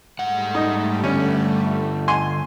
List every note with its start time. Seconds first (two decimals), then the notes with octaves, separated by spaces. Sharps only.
0.19 G#2 G3 A3 F#5
0.55 D#4
1.04 G2 D3 C#4
2.08 G#5 C6